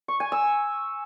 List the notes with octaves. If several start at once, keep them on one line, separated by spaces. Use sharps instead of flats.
C#6
G#5
E6